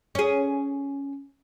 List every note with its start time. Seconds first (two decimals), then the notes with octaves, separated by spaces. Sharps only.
0.15 C#4 G#4